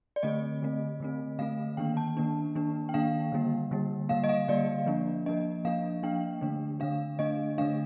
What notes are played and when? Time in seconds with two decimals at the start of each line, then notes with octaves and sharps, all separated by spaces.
0.16 D5
0.23 D3 A3 C4 D#5
0.62 D3 A3 C4
1.00 D3 A3 C4
1.39 D3 A3 C4 F5
1.77 D#3 A#3 D4 G5
1.97 A5
2.17 D#3 A#3 D4
2.55 D#3 A#3 D4
2.89 G5
2.94 D#3 A#3 D4 F5
3.32 D3 G3 A#3
3.71 D3 G3 A#3
4.09 D3 G3 A#3 F5
4.24 D#5
4.29 F5
4.48 D3 G3 A#3 D5
4.86 F3 A#3 D4
5.26 F3 A#3 D4 D#5
5.65 F3 A#3 D4 F5
6.03 F3 A#3 D4 G5
6.41 D3 A3 D4
6.80 D3 A3 D4 F5
7.19 D3 A3 D4 D#5
7.58 D3 A3 D4 F5